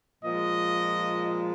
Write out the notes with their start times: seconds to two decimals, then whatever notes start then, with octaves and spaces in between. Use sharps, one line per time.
0.22 A#2 F3 G#3 D#5